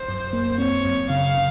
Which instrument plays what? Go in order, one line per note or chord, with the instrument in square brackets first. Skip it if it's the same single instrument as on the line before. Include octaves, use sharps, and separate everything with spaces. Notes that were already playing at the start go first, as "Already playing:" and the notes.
Already playing: [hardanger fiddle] C5
[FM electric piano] F#2
A#3
[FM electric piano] C4 [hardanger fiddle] C#5
[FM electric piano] F#2
[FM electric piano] C#3 [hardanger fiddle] F5
[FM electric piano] C#3